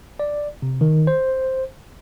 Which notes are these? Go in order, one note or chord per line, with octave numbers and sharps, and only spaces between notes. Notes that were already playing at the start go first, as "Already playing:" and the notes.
D5
C3
D#3
C5